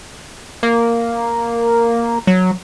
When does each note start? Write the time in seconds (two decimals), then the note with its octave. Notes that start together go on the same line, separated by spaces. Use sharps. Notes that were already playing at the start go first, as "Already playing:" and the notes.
0.63 A#3
2.27 F#3